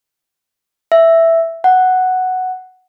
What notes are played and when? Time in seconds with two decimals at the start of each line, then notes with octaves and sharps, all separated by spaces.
0.92 E5
1.64 F#5